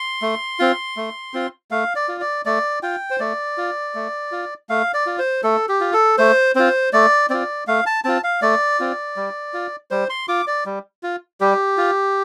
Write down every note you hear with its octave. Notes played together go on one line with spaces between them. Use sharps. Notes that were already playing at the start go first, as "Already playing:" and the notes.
Already playing: C6
A3
C4 F4
A3
C4 F4
A3 F5
D5
F4
D5
A3 D5
F4 G5
C5
A3 D5
F4
A3
F4
A3 F5
D5
F4
C5
A3 A4
G4
F4
A4
A3 C5
C4 F4 C5
A3 D5
C4 F4 D5
A3 F5
A5
C4 F4 A5
F5
A3 D5
C4 F4
G3
F4
G3 C5
C6
F4 D6
D5
G3
F4
G3 G4
F4